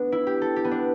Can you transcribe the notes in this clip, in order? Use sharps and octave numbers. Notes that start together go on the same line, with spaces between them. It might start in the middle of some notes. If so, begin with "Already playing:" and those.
Already playing: A3 B3 D4
E4
G4
A4
G4
B3
D4